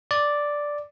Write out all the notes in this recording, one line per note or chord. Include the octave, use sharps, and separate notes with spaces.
D5